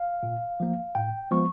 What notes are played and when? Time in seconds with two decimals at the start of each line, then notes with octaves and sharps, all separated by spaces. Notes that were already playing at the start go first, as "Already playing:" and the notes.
Already playing: F5
0.23 A#2
0.60 F3 A#3
0.95 A2 G5
1.31 F3 G#3 B3 C#6